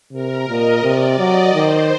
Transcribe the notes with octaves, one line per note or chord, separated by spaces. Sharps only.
C3 A#4
A#2 D#5
C3 D5
F#3 D#5
D#3 C5